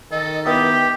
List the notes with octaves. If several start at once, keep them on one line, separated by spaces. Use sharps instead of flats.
D#3 A4 D#5
B3 E4 G4 G5 D#6